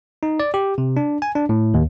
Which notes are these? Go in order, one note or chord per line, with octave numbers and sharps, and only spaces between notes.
D#4
D5
G4
C3
D4
G#5
D4
A2
D#2